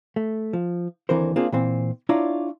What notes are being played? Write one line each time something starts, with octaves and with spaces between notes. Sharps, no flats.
A3
F3
D#2 D3 E3 C4 A#4 C5
A#3 C4 D4 F4 G#4
A#2 E3 C4
D4 E4 F4 C#5 D5 A#5